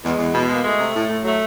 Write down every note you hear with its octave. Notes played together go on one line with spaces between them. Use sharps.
E2 G#3
E2
B2
G#3 A#3
G#3 A3
C3
A2
A2
F#3 A3